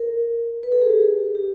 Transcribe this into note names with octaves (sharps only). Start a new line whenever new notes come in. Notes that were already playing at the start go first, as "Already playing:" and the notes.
Already playing: A#4
B4
A4
G#4
G4
G4